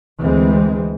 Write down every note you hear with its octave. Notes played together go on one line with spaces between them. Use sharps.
D2 E3 G#3 C4